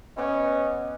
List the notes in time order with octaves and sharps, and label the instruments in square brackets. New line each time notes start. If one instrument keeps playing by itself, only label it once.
[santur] B3 D5 F#5 [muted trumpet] C#4 [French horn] D#5